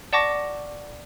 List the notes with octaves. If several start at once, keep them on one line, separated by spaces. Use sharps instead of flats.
D5 F#5 A5 C#6 D6 A#6